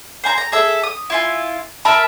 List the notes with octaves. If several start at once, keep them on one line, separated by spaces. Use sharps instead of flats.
C5 G#5 A#5
A#5
G#4 A4 E5
D#6
E4 F4 G#5
A#4 E5 A5 B5